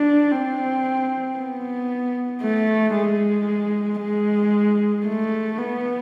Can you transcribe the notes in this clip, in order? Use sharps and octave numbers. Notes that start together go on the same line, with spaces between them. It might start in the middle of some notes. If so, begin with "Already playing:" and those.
Already playing: D4
C4
B3
A3
G#3
G#3
A3
B3